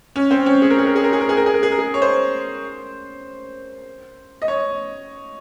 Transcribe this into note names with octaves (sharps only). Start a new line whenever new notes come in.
C#4
C4
C#4
G#4
A#4
G#4
A#4
G#4
A#4
G#4
A#4
G#4
A#4
G#4
A#4
G#4
A#4
G#4
C#5
C5
D#5
C#5